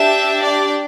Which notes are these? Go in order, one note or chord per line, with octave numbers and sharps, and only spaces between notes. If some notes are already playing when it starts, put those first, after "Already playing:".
Already playing: D4 G4 E5
D5